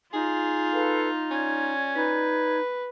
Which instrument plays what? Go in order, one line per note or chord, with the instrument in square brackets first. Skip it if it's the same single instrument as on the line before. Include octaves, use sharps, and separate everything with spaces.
[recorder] D#4 [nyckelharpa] F4 [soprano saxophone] G#4
[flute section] A4 B4 F5
[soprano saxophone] C#4 [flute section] D5 G#6
[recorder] D#4 [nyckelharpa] B4